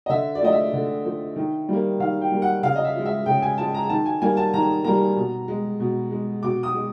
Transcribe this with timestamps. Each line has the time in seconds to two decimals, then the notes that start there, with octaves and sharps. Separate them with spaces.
0.06 D#5
0.10 D3 E5
0.35 D5
0.42 F3 A3 D#5
0.52 E5
0.73 D3
1.05 F3 A3
1.36 D#3
1.69 G3 A#3
2.00 D#3 F5
2.21 G5
2.32 G3 A#3
2.42 F#5
2.63 C#3 F5
2.75 D#5
2.84 E5
2.95 F3 G#3
3.05 E5
3.26 C#3 G5
3.42 G#5
3.58 F3 G#3 A5
3.74 A#5
3.89 D#3 A5
4.06 G#5
4.22 G3 A#3 G#5
4.37 A5
4.54 D#3 A#5
4.84 G3 A#3 A#5
5.16 B2
5.48 G#3
5.80 B2
6.11 G#3
6.43 B2 D6
6.63 D#6
6.75 G#3